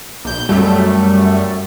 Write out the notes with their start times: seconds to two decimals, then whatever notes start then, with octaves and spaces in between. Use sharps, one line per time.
0.25 B1 G6
0.49 F#2 G3 A3